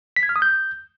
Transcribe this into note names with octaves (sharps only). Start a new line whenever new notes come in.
B6
G#6
F6
D#6
G6